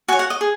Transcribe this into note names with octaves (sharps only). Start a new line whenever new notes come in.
F#4 C#5 G#5
F#5
D#5
G#4